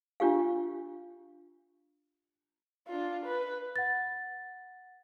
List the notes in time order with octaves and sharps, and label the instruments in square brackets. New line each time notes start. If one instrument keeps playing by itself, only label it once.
[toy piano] D4 F4 G4 F5
[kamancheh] D4 F4
B4
[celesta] F#5 A6